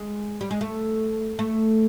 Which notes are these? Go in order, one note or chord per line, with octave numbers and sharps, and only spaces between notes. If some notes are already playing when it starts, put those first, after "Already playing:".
Already playing: G#3
G3
G#3
A3
A3